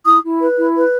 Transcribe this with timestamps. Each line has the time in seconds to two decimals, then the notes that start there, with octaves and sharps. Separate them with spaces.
0.05 E4 D#6
0.23 E4
0.40 B4
0.57 E4
0.75 B4